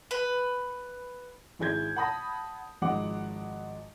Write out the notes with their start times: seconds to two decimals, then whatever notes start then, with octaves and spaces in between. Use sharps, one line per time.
0.11 B4
1.59 G#1 E4 G#4 G6 G#6
1.96 F#5 A5 B5 D#6 A#6
2.82 G#1 F3 G#3 F#5 D6